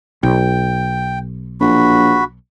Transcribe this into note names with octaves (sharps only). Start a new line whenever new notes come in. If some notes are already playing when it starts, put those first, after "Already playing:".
B1 G5
A#1 F#4 B5